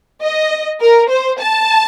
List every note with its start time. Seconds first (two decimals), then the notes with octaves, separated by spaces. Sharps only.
0.22 D#5
0.80 A#4
1.10 C5
1.40 A5